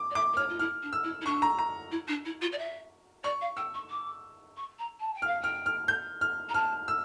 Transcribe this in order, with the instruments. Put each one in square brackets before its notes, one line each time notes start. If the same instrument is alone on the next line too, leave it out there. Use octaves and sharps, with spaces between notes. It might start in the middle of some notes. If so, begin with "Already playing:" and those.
Already playing: [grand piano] D6
[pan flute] D5
[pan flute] E5 [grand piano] D6
[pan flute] A#4
[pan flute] C#5 [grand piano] F6
[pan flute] F4
[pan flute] E4 [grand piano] F6
[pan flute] D4
[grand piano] E6
[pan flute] E4
E4
[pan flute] D4 [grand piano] C#6
[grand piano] A#5
A#5
[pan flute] E4
D4
E4
F4
D5
E5
[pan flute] D5 [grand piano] C#6
[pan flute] F5
[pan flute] G5 [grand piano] E6
[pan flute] C#6
D6
C#6
A#5
A5
G5
[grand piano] F6
[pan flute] F5
[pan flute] G5 [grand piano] F6
[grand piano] F6
G6
F6
[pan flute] A#5
[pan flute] A5 [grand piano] F6
[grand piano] E6